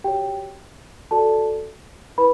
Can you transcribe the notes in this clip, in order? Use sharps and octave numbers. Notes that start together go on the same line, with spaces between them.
F#4 G4 C#5 G5
F#4 A4 D5 A5
E4 B4 B5